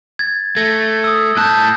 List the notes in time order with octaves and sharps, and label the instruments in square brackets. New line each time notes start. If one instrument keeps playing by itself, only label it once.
[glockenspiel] G#6 A6
[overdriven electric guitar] A3 [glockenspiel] G#6 A#6
[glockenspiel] D#6 E6
[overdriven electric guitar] A2 A5 [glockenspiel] F#6 G6